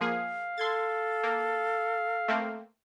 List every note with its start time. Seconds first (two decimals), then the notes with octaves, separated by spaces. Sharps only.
0.01 F3 A#3 G#4 F5
0.58 A4 C6 G#6 A6
1.23 A#3
2.28 A3 A#3 C4